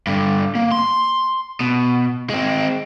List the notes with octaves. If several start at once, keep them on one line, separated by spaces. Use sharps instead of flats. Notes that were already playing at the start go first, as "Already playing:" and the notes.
G2 D3
A#3
C6
B2
G#3 C4